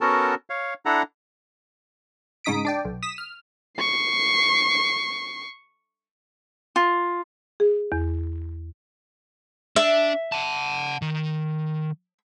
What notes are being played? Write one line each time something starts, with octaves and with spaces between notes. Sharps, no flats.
B3 C#4 F#4 A4 A#4 A5
C#5 F5
D4 E4 A4 F#5 A#5
G#2 C#3 D#4 D#6 B6 D7
D4 D5 G5
B1
D#6 B6 E7
F6
C#6 C7
F4
G#4
E2
D4 E5
F#5 A5
D#3